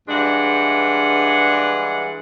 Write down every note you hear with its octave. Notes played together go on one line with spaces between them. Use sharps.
G2 E3 G#3 D4 F#5